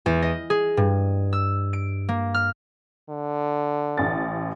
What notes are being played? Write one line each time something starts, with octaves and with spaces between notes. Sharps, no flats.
E2
D#5
G#4
G2
E6
D7
A#3
F6
D3
A1 A6